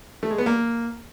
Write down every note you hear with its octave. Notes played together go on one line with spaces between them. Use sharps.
A3
G#3
B3
A#3